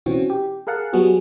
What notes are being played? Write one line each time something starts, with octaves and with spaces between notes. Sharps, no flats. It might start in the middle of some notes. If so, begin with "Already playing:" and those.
B2 E3 C4 C#4 F#4
G4
G#4 A#4 F5 F#5 A5
F#3 G3 B3 F#4 G#4